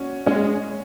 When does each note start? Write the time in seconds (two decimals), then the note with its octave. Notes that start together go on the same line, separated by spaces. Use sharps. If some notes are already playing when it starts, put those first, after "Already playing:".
Already playing: C#4 F#4
0.26 G#3 C#4